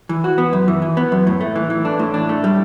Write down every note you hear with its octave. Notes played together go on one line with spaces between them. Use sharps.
E3
F#4
B3
F#2
E3
E3
B3
F#2
A2
A3
E3
E3
D4
A2
D4
A3
G3